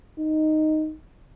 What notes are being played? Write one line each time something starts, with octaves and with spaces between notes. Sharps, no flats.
D#4